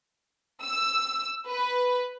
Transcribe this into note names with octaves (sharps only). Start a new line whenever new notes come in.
E6
B4